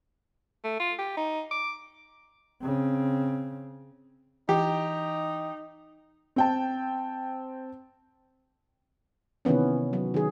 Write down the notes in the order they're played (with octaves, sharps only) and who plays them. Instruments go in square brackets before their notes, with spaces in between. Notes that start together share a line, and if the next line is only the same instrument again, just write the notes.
[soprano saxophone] A3
F4
G4
D#4
D6
[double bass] C#3 C4
[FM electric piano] E3 [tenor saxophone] D#4 [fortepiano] G4
[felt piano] C4 G5 A5
[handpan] C3 D#3 E3 B3 C#4
F#3
D#3 G#4